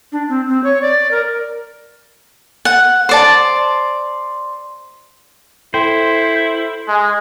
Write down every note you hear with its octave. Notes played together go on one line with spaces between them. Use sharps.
D4
C4
C4
C#5
D5
A#4
F#5
C5 D5 A5
E4 A4 C5 G5 C6
G#3